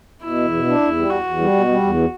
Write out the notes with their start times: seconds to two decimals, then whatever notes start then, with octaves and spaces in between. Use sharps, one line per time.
0.23 B2 E4
0.38 E2
0.53 B2
0.67 D4
0.82 E2
0.96 G3
1.10 E2 F#4
1.24 E2
1.40 G3
1.54 B2
1.68 G3
1.83 E2